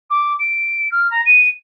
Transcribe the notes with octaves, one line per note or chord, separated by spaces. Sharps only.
D6
D7
F6
A#5
D#7